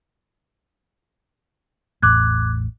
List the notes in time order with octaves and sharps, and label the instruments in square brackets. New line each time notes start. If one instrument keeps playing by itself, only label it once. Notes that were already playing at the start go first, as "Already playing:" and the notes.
[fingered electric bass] A1 E2 A2 [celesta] D6 F#6 G#6